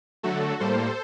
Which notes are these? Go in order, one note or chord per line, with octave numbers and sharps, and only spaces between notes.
D3 F#3 A3 F#4 A4
A2 G3 A#3 A4 C5